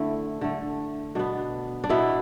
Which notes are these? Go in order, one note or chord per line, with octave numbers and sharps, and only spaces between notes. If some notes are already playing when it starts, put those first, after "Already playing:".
Already playing: D3 A3 E4
D3 A3
B2 B3 D4
D4
B2 B3 E4